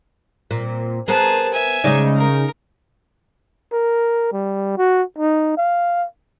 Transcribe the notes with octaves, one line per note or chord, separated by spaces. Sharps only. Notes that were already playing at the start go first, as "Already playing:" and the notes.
A#2 C4
B3 G#4 A#4 C5 A5
E5 G#5
C#3 G#3 D#4 D5
A#4
A#4
G3
F#4
D#4
F5